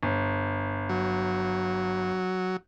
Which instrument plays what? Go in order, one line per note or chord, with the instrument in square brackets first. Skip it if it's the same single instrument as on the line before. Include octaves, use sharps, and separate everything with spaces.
[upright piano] G1
[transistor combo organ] F#3